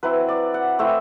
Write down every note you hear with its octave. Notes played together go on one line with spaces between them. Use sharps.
F#3 C4 E4 B4
D5
F#5
A3 C4 E4 G5